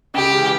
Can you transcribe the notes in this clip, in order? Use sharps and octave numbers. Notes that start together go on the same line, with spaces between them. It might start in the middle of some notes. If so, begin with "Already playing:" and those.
C#2 G4
C#3 E3